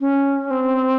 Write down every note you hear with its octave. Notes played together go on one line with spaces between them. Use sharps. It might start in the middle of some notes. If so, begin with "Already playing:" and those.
C#4
C4